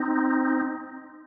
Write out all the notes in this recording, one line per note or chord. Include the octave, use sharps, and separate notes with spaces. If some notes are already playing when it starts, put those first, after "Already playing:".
Already playing: C4 D#4